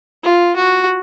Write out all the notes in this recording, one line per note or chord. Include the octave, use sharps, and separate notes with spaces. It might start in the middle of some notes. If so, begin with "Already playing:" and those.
F4
F#4